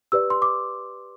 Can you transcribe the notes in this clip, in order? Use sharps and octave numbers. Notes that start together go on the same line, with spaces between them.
G4 B4 D5 E6
C6
D6